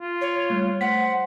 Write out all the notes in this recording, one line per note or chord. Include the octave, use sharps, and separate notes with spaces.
F4
C#5
G3 A3
C5 F#5 B6